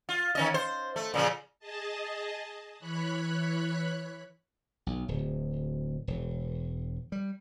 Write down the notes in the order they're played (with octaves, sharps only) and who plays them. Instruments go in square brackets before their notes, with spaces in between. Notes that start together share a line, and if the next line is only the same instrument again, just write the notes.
[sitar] F4
D#3 C#4 D#5
C5
A3
A#2 C#3 F3
[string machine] G#4 D#5 A5
E3 C#5 B5 F#6
[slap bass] B1
D1
E1
G3